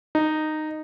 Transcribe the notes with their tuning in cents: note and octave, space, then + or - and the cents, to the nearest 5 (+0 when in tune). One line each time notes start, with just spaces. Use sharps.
D#4 -10